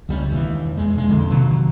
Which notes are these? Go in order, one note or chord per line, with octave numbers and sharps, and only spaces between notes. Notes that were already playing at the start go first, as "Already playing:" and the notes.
C#2 G3 A#3 C#4
E1 D#2 E3
E2 G#3
E1 G#3
D#1 B1 F2 D3
C3 D#3 F#3 A#3